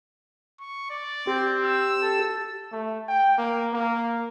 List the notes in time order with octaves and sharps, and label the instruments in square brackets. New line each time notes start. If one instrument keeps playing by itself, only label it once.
[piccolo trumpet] C#6
D5
[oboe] C4 [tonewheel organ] G4
[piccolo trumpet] E6
[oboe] A4
[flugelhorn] A3
G5
A#3
A#3